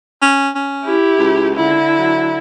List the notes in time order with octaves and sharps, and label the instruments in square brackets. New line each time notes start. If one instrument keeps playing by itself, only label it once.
[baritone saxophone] C#4
C#4
[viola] E4 G4
[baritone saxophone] C#2
[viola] D3 E4
[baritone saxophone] F#3